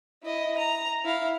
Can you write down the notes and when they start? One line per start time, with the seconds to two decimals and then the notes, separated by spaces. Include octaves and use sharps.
0.24 E4 D#5
0.58 A#5
1.05 E4 F5